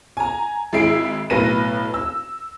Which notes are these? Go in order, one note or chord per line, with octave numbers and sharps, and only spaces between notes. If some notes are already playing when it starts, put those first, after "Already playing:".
G#5 A#5
G#1 G#3 E4 E5 C7 D7
B1 A2 B4 A#6 D#7
E6